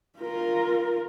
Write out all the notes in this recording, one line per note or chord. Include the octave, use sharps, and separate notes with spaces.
F4 A#4